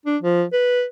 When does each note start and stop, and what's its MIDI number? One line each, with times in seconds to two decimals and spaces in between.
0.06 0.17 62
0.22 0.44 53
0.52 0.85 71